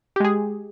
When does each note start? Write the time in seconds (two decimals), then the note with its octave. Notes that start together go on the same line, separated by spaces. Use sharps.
0.16 G4
0.20 G#3
0.25 G#4